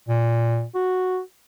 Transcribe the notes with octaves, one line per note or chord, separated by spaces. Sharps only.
A#2
F#4